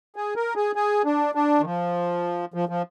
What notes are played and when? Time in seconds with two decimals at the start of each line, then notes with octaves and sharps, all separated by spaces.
0.16 G#4
0.36 A#4
0.56 G#4
0.76 G#4
1.05 D4
1.35 D4
1.60 D#3
1.65 F3
2.54 F3
2.69 F3